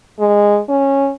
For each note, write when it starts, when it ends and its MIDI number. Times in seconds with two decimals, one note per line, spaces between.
0.19 0.60 56
0.69 1.11 61